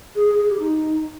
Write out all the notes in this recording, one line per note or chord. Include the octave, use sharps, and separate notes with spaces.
G#4
G#4
G#4
G4
D#4